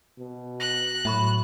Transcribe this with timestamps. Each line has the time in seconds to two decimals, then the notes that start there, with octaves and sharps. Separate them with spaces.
0.18 B2
0.60 F#6 A#6
1.05 A2 F#3 E5 B5 C#6